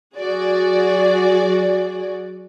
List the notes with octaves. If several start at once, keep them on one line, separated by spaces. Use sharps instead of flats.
F#3 F#4 G#4 D5